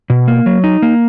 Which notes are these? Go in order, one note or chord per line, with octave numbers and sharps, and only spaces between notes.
B2
A#3
F#3
D#4
A#3